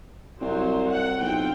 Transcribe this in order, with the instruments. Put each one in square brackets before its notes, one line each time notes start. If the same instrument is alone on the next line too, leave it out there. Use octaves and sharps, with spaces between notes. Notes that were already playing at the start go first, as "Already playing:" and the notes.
[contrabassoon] C2 [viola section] F#3 C5
[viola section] F#5
[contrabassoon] B1 [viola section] C4 F4 G5